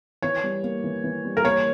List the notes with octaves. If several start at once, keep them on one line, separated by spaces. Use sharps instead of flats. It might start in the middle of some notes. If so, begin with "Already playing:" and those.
E3 C#5
G3
A#3
E3
E3
G3
A#4
A#3 C#5